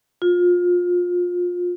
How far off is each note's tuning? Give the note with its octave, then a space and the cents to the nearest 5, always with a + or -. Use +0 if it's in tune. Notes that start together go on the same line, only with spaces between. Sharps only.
F4 +25